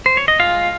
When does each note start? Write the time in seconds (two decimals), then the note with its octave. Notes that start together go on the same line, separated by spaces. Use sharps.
0.06 C5
0.17 C#5
0.28 D#5
0.40 G#3 F4 F5